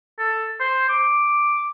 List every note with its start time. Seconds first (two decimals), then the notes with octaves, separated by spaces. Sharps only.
0.19 A4
0.60 C5
0.89 D6